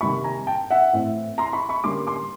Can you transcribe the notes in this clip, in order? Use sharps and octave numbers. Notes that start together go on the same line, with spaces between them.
C3 D#3 G3 A#3 B5 C#6
G#5 A#5
G5 A5
E5 F#5
A2 E3 A3 C4
A#5 C6
B5 C#6
B5 C#6
D3 G3 A#3 C#4 C6 D6
C6 D6